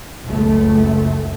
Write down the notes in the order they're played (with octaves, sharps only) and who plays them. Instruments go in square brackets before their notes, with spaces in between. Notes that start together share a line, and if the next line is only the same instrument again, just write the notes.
[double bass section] F#1 C#2 A3